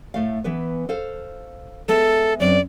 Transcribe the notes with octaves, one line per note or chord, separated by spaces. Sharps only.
A2 A3 F5
E3 B3 B4
A4 C5 F5
G#3 B3 A4 E5
F#2 C4 D4 D5